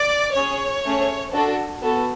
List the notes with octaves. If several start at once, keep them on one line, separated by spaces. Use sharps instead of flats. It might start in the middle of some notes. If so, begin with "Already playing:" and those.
Already playing: D5
C#4 G#4 C#5
A3 C#4 G#4
D4 F#4 A4
B3 F#4 A4